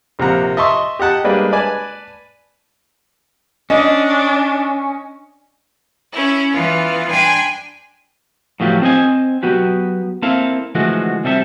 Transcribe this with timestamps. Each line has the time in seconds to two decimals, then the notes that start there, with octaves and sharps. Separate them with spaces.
0.19 A#1 C3 A#3 F5 F#5 A#5
0.57 D#5 E5 A5 C6 C#6
0.99 G4 D#5 F#5 A5
1.24 G3 G#3 A#3 D4 B4
1.52 B4 D5 G#5 A5
3.70 C#4 D4 D#5
6.11 C#4 E4
6.53 E3 B3 F4
7.10 D4 G5 G#5 B5 C6
8.60 A2 F3 F#3 B3 F4 G4
8.82 C4 C5 D#5 G#5
9.43 F#3 B3 F#4 G4
10.22 A#3 C4 E4 A4 F5
10.75 D3 E3 F3 G#3 A3 F#4
11.24 C3 G3 C4 A4 C5 E5